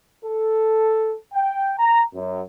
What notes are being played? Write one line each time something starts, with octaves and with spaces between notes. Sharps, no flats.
A4
G5
A#5
F#2